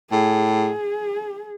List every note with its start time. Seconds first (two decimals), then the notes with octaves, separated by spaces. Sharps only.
0.11 A2 G#4
0.53 G#4